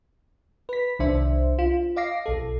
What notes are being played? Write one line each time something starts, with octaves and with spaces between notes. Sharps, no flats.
B4 B6
C2 D#3 D4 C5 E5
F4
D#5 F5 D6 A#6 C7
B1 A4